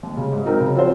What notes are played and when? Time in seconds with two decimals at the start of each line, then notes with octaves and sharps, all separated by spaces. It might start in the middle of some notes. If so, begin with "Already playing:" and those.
0.03 D#2
0.17 C#3 G#3
0.32 G#2
0.46 F#3 C4 D#4 A#4
0.60 C#3
0.75 F3 C4 F#4 C5